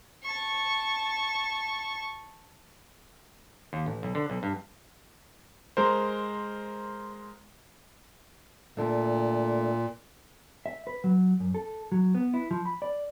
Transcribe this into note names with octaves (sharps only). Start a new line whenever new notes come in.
A5 C#6
D#2
A1
B1
D3
B1
G2
G#3 A#4 C5
A#2 A3 D4 A4
E5
B4
F#3
F#2
A4
F#3
B3
E4
F3
B5
D5